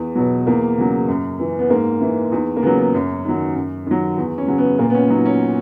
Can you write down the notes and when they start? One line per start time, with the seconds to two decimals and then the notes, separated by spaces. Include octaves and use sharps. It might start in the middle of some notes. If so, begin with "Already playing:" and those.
Already playing: E2
0.15 B2 F#3
0.47 E2 A#3
0.77 C#3 F#3
1.08 F#2
1.40 E3
1.59 B3
1.70 G#2 A#3
2.01 E3 E4
2.32 E2 D#4
2.56 A#3
2.62 C#3 B3
2.67 F#3
2.78 B3
2.94 F#2 C#4
3.25 D#3 F#3
3.55 F#2
3.86 D#3 F#3
4.17 E2
4.38 C#4
4.48 C#3 F#3
4.58 B3
4.79 A#2 A#3
4.90 B3
4.94 C#4
5.10 F#3 D#4
5.25 C#4